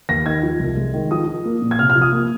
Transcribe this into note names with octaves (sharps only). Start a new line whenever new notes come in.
D#2 A#6
D#3 G#6
F3
C2
G#3
D#3
F3 D#6
F3
A#3
A#2
G#6
C3 F6
F6
F3
D#6
A#3